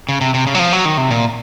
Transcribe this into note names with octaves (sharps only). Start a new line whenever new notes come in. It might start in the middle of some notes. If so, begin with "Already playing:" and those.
C#3
C3
C3
C#3
F#3
F3
F#3
D#3
C3
A#2